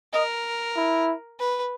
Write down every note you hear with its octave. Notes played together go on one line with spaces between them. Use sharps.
A#4 D#5
E4
B4